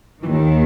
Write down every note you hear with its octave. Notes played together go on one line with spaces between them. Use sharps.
D#2 D#3 E3